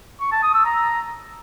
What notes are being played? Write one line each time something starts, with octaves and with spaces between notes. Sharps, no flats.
C#6
A5
D#6
E6
A#5